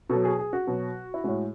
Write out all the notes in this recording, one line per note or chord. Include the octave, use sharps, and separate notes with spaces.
B2 F#3 A4
G#4
G#4
F#4
B2 F#3
E4
A2 G#3 F#4